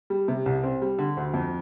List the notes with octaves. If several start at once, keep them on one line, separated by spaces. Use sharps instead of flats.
G3
C3
C2
C4
G3
D3
D2
F2